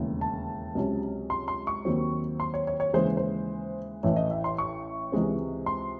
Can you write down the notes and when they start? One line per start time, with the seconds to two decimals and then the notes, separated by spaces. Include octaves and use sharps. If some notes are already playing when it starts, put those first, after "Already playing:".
Already playing: E1 D#2 C#3 E3 A3
0.21 A5
0.75 C#2 C3 F#3 C#4
1.30 C6
1.48 C6
1.67 C#6
1.85 D#2 D#3 F#3 C4
2.40 C6
2.54 C#5
2.67 C#5
2.80 C#5
2.94 D#2 C#3 E3 G#3 C5
3.17 C5
4.03 A1 A2 E3 A3 C#5
4.16 D#5
4.31 E5
4.44 C6
4.58 C#6
5.12 C#2 C3 E3 G#3 C4
5.66 C6